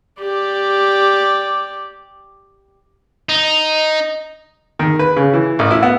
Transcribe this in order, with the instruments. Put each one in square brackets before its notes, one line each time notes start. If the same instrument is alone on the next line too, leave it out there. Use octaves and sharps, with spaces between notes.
[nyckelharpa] G4 D5
[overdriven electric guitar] D#4
[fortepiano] D#3
B4
C#3
E3
A1
E4
B3